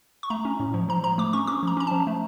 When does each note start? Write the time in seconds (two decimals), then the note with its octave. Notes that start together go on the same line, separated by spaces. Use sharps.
0.23 C#6
0.30 A3 A#5
0.45 C#4
0.60 A2
0.74 F3
0.89 F3 A#5
1.03 F3 A#5
1.18 A3 D6
1.33 C#4 C#6
1.47 C#4 D6
1.63 F3 A#5
1.77 C#4 A#5
1.87 F3 A5
2.07 A3